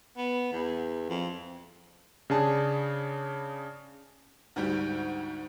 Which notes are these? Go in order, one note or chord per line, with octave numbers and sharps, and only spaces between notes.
B3
E2
F2
C#3 D4 G#4 A5
D2 G#2 G3 F#4 G4 D7